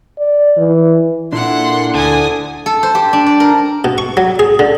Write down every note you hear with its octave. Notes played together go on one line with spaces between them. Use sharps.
D5
E3
A#2 D4 E4 A4 F#5 C6
D2 D3 G#5 D#6
A4
C5
G4
D4
D5
A#4
B2
C#6
F#3
G#4
D3